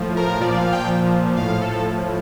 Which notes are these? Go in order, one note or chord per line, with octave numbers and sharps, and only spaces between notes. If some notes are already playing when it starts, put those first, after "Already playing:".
Already playing: A2 F3
A#4
A#2 F3 D5
F5
G5
A2 F3 F5
A4